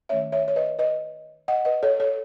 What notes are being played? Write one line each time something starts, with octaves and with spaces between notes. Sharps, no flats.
D#3 A3 C#4 C#5 E5
C#5 E5
C#5
B4 D#5
B4 D#5
D#5 F#5
B4 D#5
A4 C#5
A4 C#5